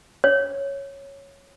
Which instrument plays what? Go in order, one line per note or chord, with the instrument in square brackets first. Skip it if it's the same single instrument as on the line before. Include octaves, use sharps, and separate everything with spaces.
[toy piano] C#5